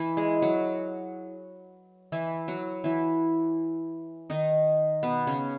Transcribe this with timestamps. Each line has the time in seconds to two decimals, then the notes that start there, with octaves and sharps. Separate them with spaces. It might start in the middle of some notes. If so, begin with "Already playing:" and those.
Already playing: E3 E4
0.17 G#3 G#4
0.42 F#3 F#4
2.12 E3 E4
2.48 F#3 F#4
2.84 E3 E4
4.30 D#3 D#4
5.03 B2 B3
5.27 C#3 C#4